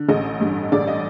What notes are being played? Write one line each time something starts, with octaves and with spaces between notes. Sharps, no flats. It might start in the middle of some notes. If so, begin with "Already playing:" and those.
Already playing: D3
A1 D#5
G2
A1 D5
D#5